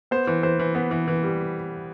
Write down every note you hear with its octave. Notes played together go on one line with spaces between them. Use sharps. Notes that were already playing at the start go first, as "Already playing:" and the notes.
B3 C5
E3
E3 C5
E3
B3
E3
E3
G3